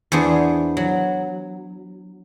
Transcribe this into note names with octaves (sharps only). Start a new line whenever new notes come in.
E2 B3 D4 G#4 C5
F#3